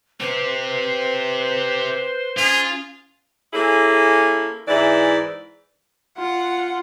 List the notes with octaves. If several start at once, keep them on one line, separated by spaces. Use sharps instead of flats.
C4 G4 B4 C5
C#4 F4 G#4
A#3 C#4 E4 G#4 A4
G#2 E3 E4 D5
F4 F#5